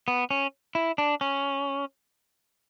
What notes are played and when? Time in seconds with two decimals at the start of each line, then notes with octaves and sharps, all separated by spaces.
0.08 B3
0.31 C#4
0.75 E4
0.98 D4
1.21 C#4